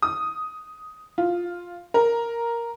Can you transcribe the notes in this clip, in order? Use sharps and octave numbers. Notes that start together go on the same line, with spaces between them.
D#6
F4
A#4